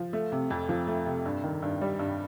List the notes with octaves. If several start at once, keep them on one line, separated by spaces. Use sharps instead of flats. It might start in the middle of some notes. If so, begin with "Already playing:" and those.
Already playing: F3
A3
C3
F2
F3
A3
C3
G2
D#3
G2
G3
G2